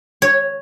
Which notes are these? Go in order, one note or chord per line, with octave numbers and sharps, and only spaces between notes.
C#5